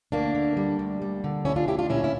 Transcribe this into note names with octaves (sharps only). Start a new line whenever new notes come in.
D2 A#3 D4
D3
G3
D2
G3
D3
D2 C#4 E4
D4 F4
D2 E4 G4
D4 F4
A#2 C#4 E4
E4